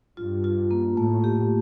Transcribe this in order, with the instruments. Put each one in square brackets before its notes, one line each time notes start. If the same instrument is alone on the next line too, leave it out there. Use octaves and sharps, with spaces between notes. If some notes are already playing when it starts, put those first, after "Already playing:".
[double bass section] G2 [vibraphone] F4
[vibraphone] F4
A#3
[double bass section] A2 [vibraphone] A3
[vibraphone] G4